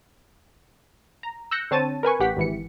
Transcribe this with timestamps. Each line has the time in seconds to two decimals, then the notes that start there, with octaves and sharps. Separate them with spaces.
1.23 A#5
1.51 E6 F#6 G6 A#6 C#7
1.71 D3 C4 C#5 A5 A6 D#7
2.03 A#4 B4 G#5 C#6
2.20 A1 G4 F#5 B6
2.37 G#1 E3 C#7